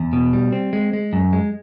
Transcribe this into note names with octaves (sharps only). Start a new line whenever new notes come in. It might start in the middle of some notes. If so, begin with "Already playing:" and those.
Already playing: E2
B2
G3
C4
G#3
G#3
F#2
G#3